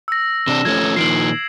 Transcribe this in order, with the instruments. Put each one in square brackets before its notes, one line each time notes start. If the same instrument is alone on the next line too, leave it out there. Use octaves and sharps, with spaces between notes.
[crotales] E6 A#6
[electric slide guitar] C3 D4 [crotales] E7
[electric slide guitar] F3 A3 C#4 [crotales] G#6
[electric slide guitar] A#2 D#3 F3 [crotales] C7 D7 F#7